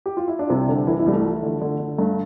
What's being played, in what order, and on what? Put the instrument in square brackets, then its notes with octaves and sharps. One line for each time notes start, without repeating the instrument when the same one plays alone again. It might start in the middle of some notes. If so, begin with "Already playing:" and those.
[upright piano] G4
F4
E4
D4
C2 C3 C4
C2 D3 D4
C2 E3 E4
E3 E4
C2 G3
A3
F3
D3
D3
D3
G2 A3